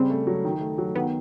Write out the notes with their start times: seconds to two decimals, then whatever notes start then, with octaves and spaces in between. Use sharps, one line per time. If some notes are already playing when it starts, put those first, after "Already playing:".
Already playing: C#3 G3 C4
0.10 A3
0.27 F#3
0.45 D#3
0.61 A3
0.78 F#3
0.95 D#3 B3